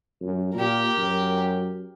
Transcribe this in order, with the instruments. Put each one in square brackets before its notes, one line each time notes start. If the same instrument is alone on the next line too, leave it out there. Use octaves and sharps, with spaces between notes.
[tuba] F#2
[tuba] A#2 [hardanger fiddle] G4 A#4
[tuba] F#2